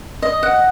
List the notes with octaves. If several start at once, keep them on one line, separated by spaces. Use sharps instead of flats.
D#5
F#5